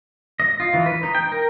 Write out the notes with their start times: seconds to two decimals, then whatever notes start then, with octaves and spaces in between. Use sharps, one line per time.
0.40 D#5
0.60 F4
0.74 E3
0.86 B4
1.03 D#4
1.15 G5
1.32 A#4